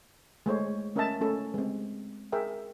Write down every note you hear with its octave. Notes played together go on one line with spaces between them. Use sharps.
G#3 A3 C5 C#5
A3 C#4 A#4 D#5 E5 A5
A3 C#4 A4
G#3 C4
G#4 A#4 E5 G5